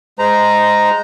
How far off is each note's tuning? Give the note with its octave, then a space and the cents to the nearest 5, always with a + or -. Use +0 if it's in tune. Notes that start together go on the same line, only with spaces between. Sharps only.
G#3 +0 C5 -20 A#5 +0